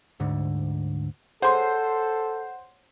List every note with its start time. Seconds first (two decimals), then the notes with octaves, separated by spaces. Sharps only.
0.20 D2 G#2 D3
1.42 G#4 A4 C5 C#5 F#5 C6